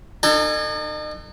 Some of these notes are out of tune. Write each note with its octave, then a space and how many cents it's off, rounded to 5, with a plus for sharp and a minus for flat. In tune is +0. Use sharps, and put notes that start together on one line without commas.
D#4 -40 A4 +30 G#5 +0